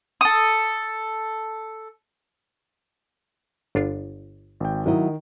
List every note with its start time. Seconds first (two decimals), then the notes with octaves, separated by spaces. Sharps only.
0.21 A4 D#6
3.75 G1 D4 F4
4.60 G#1 G5
4.86 D#3 F#3 E4 D#5